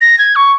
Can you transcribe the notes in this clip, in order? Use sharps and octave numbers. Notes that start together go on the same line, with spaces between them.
A#6
G#6
C#6